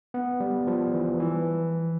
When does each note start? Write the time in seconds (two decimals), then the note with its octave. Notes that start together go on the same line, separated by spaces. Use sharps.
0.14 B3
0.40 G3
0.67 F3
0.94 E3
1.20 E3